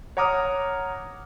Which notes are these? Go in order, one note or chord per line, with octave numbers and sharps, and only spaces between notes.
C#5 F#5 A#5 D6 D#6 F6